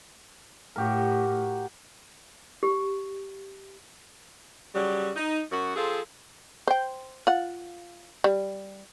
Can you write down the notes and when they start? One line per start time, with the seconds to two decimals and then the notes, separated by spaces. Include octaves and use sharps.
0.76 A2 F#4 G4 A#4
2.63 G4
4.73 C#3 F#3 G3
5.16 D#4
5.51 F#2 F#4
5.75 F3 C4 G#4 A4 F5
6.67 C5 G5
7.27 F4 F#5
8.24 G3